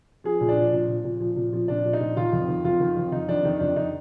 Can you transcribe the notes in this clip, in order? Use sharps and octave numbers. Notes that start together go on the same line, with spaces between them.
F3 G#4
A#2
D4
F3
A#2
F3
A#2
F3
A#2
F3
A#2 D4
F3
D#4
A#2
D#3 F4
F2
D#3
F2 F4
D#3
F2
D#3 D#4
F2 D4
D#3 D#4
F2 D4
D#3 D#4